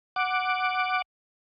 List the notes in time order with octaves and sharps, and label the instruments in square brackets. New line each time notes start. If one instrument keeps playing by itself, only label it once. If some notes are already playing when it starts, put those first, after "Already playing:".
[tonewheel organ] F#5 D6